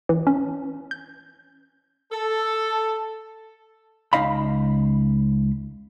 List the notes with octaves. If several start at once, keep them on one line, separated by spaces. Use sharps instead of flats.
E3
C#4
G6
A4
C#2 A#3 D#4 D#5 F5 B5